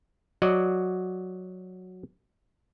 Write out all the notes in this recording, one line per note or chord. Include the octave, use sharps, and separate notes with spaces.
F#3 F#4 D5 D#5